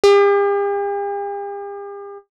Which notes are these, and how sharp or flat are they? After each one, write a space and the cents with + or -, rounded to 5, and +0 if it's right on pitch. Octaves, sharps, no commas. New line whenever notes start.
G4 +45